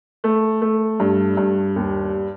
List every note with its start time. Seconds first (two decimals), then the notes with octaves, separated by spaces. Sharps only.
0.24 A3
0.62 A3
1.00 G2
1.37 G2
1.76 D#2